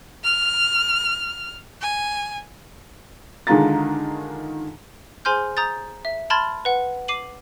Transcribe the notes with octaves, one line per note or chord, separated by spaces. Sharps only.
F6
G#5
D3 D#3 G#3 F4 A#5 A6
G#4 C5 G#5 C6 F6 G6
A#5 D#6 G6 A6
E5
A5 B5 C6 F6 G#6 A6
B4 F#5
D6 C7 D#7 F#7